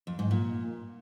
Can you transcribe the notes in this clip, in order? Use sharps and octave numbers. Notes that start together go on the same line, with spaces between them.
F2
G#2
A#2